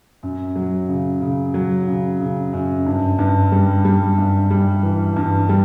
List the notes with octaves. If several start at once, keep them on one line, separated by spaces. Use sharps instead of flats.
F#2
F#3
C#3
C#3
F#3
C#3
C#3
F#2
G2
G2
G3
G3
G2
G3
E3
G2
G3